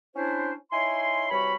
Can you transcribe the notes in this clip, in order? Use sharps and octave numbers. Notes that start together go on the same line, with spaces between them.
C#4 D4 E4 C5
D#4 E4 C#5 G#5 C6
C3 E3 G3 F#4 C#5 B5